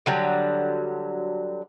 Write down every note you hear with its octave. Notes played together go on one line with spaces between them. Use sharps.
D3 F#3 G3